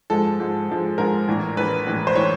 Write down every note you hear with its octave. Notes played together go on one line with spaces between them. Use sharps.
G#2 F3 G#3 A4
G#2 F3 G#3
G#2 F3 G#3
G#2 F3 G#3 A#4
A#1 A2 E3
A#1 A2 E3 B4
A#1 A2 E3
C5
A2 E3 C#5